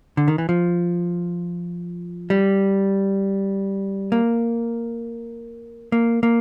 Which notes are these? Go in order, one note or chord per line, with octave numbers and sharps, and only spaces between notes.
D3
D#3
E3
F3
G3
A#3
A#3
A#3